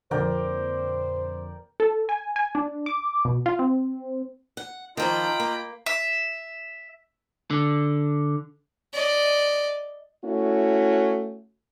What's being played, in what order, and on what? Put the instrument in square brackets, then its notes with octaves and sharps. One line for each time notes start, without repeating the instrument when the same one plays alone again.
[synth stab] F2 A#2 D3 [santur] A#4 D5 G5 [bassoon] C5
[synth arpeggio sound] A4
G#5
G#5
D4
D6
B2
F4
C4
[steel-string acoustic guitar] F#5
[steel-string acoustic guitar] D#3 F3 A#3 [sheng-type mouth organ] F4 D#5 A#5 [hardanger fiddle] G5 B5
[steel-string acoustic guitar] A#3
[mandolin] E5
[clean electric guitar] D3
[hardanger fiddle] D5 D#5
[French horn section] A3 C#4 E4 F#4